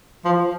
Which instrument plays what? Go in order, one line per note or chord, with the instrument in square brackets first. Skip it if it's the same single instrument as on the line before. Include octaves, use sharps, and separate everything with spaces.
[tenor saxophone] F3